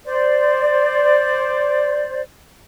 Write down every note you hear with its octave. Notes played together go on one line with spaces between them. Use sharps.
C5 D5